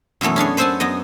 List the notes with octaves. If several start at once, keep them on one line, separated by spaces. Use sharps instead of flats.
F#2 B2 E3 A3 B3
C#4 D4 G#4 C#5
B4 C5 E5 F#5 G#5 A5
F#2 B3 D#5